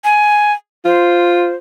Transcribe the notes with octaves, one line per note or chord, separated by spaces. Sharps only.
G#5
F4 C5